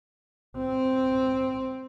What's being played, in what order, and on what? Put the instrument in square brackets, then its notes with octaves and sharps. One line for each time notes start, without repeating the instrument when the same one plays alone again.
[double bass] C4